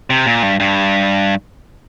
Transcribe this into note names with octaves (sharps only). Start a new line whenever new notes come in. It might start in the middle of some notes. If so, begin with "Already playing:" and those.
C3
A#2
G2
G2